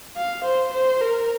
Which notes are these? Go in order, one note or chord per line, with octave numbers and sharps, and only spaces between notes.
F5
C5
C5
A#4